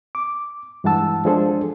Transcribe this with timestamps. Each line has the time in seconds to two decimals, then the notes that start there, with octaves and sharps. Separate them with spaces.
0.15 D6
0.84 G2 E3 G#3 F#5 A5 E6
1.25 F3 G#3 D4 G#4 A4 C5